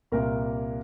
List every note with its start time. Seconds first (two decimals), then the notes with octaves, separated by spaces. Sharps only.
0.12 C2 A#2 A#3 A#4